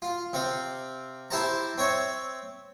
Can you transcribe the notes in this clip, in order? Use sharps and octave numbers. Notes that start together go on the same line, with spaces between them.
F4
C3 C4 F5
E4 G4 C5 A5 A#5
C4 C#5 E5